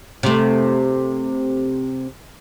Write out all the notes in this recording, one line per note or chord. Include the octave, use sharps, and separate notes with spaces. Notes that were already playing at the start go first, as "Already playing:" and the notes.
C3 A3